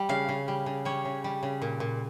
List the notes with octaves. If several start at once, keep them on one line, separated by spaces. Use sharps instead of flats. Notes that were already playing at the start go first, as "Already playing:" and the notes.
Already playing: G3
C#3 F5
C#3
G3
C#3
G3 C#5
C#3
G3
C#3
A#2
A#2